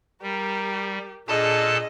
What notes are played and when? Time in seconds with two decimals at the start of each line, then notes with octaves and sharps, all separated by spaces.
0.22 G3 G4 A#4
1.28 A#2 D4 G#4 A4 D#5 A5